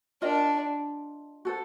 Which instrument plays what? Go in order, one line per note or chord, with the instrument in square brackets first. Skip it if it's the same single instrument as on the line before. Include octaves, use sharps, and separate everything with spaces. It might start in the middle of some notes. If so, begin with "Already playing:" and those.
[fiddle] D4 [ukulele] F4 A#4 D#5 G5
[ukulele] F#4 A4 C5